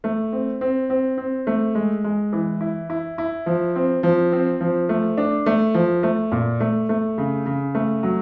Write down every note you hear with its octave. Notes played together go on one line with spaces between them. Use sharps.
A3
C4
C4
C4
C4
A3
G#3
G#3
E3
E4
E4
E4
F3
C4
F3
C4
F3
A3
D4
A3
F3
A3
A#2
A3
A3
C#3
C#3
A3
F#3